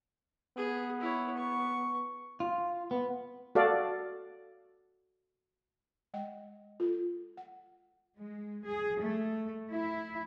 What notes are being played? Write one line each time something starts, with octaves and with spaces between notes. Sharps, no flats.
B3 G#4
E4 C#5
C#6
F4
B3
F#4 A4 D5 F5
G#3 D#5 F#5 G5
F4 A4
F#5
G#3
G#4
A3
E4